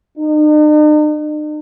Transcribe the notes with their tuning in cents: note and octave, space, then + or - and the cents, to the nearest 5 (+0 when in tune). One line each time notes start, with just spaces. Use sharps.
D#4 -45